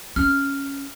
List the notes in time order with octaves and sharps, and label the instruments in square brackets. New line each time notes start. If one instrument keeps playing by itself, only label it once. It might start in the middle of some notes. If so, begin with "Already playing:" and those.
[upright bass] C#4 [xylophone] F6